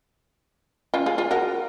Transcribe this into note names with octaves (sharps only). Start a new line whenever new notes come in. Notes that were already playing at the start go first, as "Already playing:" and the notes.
C#4 F4
F4 G#4
F4 G#4
F#4 A#4